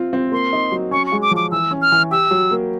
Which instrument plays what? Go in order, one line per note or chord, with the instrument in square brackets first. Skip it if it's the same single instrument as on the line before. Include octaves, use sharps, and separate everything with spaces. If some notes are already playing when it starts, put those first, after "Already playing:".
Already playing: [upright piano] C4 F4
C4
[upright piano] A#3 [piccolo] C6
[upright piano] D#4
F#3
[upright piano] C#4 [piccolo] C#6
[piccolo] C#6
[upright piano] G#3
[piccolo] D6
[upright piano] F3
[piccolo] D6
[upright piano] E3 [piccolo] E6
[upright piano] C#4
[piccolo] F6
[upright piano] E3
[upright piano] G4 [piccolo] E6
[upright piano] F#3
A#3